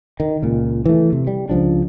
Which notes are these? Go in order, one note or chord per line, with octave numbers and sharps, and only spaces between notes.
D#3
C#2 A#2
E3 A3
C3
G3
C#2 F3 D4